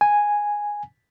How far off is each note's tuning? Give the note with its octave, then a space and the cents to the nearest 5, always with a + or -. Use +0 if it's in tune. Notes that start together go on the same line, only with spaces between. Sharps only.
G#5 -5